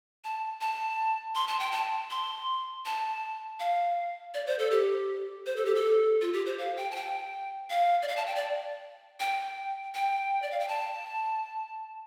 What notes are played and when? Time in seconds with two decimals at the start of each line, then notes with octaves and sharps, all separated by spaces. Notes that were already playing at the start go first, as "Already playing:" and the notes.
0.24 A5
0.61 A5
1.35 C6
1.48 A5
1.59 G5
1.72 A5
2.10 C6
2.86 A5
3.60 F5
4.34 D5
4.47 C5
4.59 A4
4.71 G4
5.46 C5
5.56 A4
5.65 G4
5.75 A4
6.21 F4
6.33 G4
6.46 C5
6.58 F5
6.77 G5
6.91 A5
6.96 G5
7.70 F5
8.02 D5
8.08 F5
8.16 A5
8.27 G5
8.36 D5
9.20 G5
9.94 G5
10.42 D5
10.51 F5
10.60 G5
10.68 A5